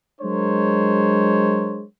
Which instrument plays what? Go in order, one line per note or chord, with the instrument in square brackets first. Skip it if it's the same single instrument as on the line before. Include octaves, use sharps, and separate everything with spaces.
[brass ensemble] F#3 G#3 D4 A#4 C5 C#5